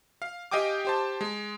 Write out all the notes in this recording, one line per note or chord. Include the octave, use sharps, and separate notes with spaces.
F5
G4 D#5 F5 G5 G#5 D6
G4 C5 A5
G#3